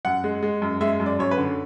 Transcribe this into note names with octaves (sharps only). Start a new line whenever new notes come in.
F#2 F#5
G#3
G#3
F#2
G#3 E5
F#2
D5
F#2 C#5
B4
D3